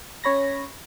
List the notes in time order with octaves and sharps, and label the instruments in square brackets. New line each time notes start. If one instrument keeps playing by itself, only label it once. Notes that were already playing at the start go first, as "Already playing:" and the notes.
[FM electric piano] C#4 C#5 B5 A#6